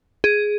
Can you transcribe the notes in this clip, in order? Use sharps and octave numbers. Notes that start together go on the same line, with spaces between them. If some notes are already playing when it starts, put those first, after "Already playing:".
G#4